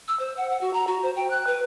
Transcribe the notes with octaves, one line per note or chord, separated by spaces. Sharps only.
E6
C5
F#5
F#5
F#4
A#5
F#4
C5
G5
F#6
B4